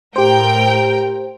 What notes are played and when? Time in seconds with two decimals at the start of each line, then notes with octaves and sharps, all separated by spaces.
0.16 A2 G4 A#4 C5 G5